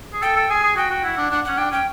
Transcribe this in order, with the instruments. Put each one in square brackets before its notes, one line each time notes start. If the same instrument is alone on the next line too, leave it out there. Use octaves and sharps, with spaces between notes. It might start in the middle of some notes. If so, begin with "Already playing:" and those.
[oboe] G#4
[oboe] A4 [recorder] G5
[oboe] A4
[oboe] G#4 [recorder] G#5
[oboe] G#4
[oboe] F#4 [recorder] G5
[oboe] F#4
[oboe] E4 [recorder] F#5
[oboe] D4
[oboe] D4 [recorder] F#5
[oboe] C#4 [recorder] F#5
[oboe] D4 [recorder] G5
[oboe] C#4 [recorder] G5